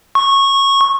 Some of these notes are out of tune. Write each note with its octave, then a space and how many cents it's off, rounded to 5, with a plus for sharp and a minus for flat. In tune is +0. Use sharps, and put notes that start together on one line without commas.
C#6 -15